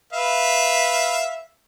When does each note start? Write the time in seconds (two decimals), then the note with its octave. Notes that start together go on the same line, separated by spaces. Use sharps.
0.13 B4 E5 F5